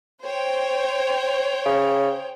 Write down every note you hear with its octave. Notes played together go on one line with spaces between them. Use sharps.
C5 C#5 G5
C#3